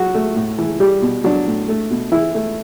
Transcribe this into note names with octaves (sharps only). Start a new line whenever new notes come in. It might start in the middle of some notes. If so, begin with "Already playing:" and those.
Already playing: F#3 F#4
A3
A2
E3
G3 G4
B2
F#3 D4
A2
A3
B2
E3 E4
A3